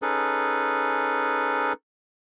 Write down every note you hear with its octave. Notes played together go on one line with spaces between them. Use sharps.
C#4 D#4 G#4 A4 B4